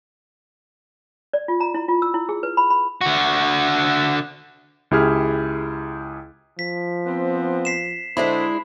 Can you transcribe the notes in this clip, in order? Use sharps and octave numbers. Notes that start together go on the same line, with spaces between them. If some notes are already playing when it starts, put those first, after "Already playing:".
D5
F4
A#5
E4
F4
E6
E4
G#4
B4
B5
B5
D3 F#4
C#2 E4 G4 G#4 F6
F3 B6
B3 C4
B6 C7 E7
D3 G#3 D4 E4 C5 B5